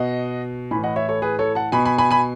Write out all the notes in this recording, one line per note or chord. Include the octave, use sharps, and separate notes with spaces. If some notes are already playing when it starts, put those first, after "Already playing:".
Already playing: B2 D#5 F#5
A2 E3 G#5 B5
D#5 F#5
C#5 E5
A4 C#5
G#4 B4
A4 C#5
F#5 A5
B2 G#5 B5
G#5 B5
G#5 B5
G#5 B5